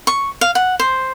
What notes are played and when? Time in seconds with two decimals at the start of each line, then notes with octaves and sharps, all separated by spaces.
0.07 C#6
0.41 F5
0.55 F#5
0.80 C5